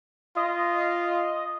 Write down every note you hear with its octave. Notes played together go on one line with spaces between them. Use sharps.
F4 D#5